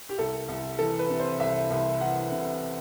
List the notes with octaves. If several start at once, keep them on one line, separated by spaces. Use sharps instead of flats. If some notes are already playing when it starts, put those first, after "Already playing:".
G4
C2 A4
C2
E3 A4
B4
C3
C5
C2 E5
C2
E3 F#5
C3